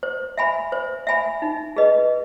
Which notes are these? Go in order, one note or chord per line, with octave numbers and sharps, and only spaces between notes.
C5
E5 G#5 B5
C5
E5 G#5 B5
D#4
G#4 B4 D#5